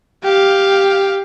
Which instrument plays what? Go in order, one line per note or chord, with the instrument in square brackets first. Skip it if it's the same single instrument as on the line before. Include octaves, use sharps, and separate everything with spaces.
[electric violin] G4 F5